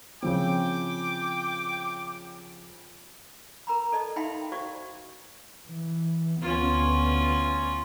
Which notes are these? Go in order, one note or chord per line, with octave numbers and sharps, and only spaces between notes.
C#3 F3 C4 G5 D6
A#4 A#5 B5
A4 D5 D#5 A5
D#4 E5 F5 G5 B5 C6
F#4 C5 D5 F5 C#6
E3
D2 B3 C#4 F4